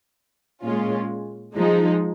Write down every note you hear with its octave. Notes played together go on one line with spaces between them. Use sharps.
A#2 G#3 C#4 F4
F3 G#3 D#4